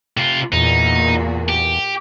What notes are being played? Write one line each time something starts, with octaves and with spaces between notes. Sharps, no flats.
C3 F4
E2 A#2 D#4 F#4
G4